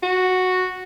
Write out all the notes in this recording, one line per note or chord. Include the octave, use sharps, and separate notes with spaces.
F#4